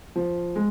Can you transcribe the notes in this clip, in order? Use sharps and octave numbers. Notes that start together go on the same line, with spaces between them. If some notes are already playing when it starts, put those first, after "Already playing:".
F3
G#3